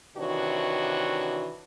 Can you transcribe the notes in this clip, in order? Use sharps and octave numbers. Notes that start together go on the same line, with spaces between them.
C3 D#3 E3 D4 F#4 C#5